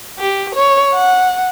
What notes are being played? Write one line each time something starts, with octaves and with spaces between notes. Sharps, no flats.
G4
C#5
F#5